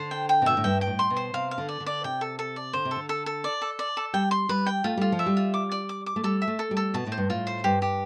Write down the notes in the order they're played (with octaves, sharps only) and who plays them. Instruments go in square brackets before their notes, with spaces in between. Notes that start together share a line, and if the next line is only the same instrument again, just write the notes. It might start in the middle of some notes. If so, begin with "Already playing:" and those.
Already playing: [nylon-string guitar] D3 [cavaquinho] C5
[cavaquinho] G5
G5
[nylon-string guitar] C3
[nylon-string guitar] B2 [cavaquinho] E5
[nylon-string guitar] A2
[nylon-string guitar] G2 [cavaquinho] G5
[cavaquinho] G5
[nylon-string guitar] A2
[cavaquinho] C6
[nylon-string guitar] B2
[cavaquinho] C5
[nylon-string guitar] C3 [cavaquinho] F5
[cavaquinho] F5
[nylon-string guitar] D3
[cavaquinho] D5
[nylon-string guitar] D3
[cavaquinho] D5
[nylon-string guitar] C3 [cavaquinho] G5
[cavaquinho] A4
A4
D5
[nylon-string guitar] D3 [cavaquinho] C5
[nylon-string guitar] C3
[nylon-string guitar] D3 [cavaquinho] A4
[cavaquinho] A4
A4
D5
A4
D5
A4
[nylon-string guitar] G3 [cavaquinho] G5
[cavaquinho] C6
[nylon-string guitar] G3 [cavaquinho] B4
[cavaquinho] G5
[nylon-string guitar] A3 [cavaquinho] F4
[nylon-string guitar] G3 [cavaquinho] F4
[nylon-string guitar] F3
[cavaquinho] E5
[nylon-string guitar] G3
[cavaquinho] F4
D6
D5
D6
D6
[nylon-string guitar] A3
[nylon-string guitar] G3 [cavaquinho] A4
[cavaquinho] E5
[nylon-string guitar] A3
[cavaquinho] A4
[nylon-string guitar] G3
[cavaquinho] A4
[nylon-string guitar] B2 [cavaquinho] A5
[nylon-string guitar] A2
[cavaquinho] C5
[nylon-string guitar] G2
[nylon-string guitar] A2 [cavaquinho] F4
[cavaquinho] C5
[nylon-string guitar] G2 [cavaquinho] G4
[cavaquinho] G4